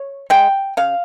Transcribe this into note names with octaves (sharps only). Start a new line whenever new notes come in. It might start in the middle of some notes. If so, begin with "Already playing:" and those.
Already playing: C#5
G#3 G5
C#3 F5